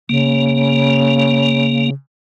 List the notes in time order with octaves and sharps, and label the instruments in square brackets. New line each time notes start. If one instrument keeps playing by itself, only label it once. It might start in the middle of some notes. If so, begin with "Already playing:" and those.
[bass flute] C#3 [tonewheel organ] A#3